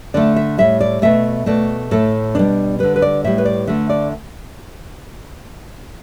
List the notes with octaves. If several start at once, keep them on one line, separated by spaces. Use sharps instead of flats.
D3 A3 D5
E5
A2 G3 E5
D5
B2 A3 E5
B2 A3 D5
A2 A3 A4
B2 G3 D4
D3 G3 B4
B4
D5
A2 G3 E5
B4
D5
D3 A3 E5
D5